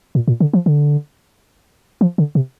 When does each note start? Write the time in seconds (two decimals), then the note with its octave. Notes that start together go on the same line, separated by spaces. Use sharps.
0.15 A#2
0.28 A#2
0.40 D3
0.53 F3
0.66 D3
2.01 F3
2.18 D3
2.35 C3